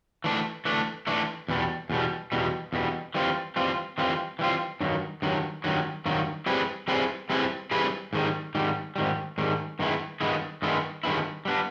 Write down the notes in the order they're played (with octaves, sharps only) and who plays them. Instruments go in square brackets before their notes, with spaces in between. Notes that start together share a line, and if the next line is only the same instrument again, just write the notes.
[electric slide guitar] E3 A3 D4
E3 A3 D4
E3 A3 D4
E2 B2 G3
E2 B2 G3
E2 B2 G3
E2 B2 G3
E3 G3 C4 F4
E3 G3 C4 F4
E3 G3 C4 F4
E3 G3 C4 F4
G2 D#3 F#3
G2 D#3 F#3
G2 D#3 F#3
G2 D#3 F#3
G3 C4 E4 G#4 B4
G3 C4 E4 G#4 B4
G3 C4 E4 G#4 B4
G3 C4 E4 G#4 B4
G#2 D#3 G3
G#2 D#3 G3
G#2 D#3 G3
G#2 D#3 G3
G2 D#3 G#3 B3 E4
G2 D#3 G#3 B3 E4
G2 D#3 G#3 B3 E4
G2 D#3 G#3 B3 E4
G3 B3 D4